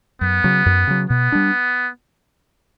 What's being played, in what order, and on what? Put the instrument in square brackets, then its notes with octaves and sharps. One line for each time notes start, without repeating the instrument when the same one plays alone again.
[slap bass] F#2 [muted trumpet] B3
[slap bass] C#3 F#3
F#2
C#3 F#3
[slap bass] B2 [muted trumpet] B3
[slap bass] G3 D4